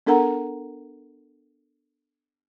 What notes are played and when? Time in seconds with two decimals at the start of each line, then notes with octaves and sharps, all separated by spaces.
0.07 B3 D4 A4 A#4 F#5 A#5